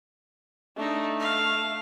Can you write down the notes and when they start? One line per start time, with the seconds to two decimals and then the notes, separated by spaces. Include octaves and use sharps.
0.76 A3 D4 D#4
1.19 F5